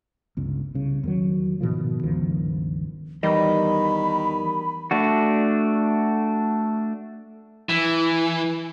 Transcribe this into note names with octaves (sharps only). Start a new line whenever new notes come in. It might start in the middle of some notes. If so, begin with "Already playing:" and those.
G1 C#2
C2 C#3
E2 D#3 F#3
G#2 B2 D#3 F3
G1 C#2 D#3 F3
E2 D#3 G3 D#5 B5
A3 D4 F#4
E3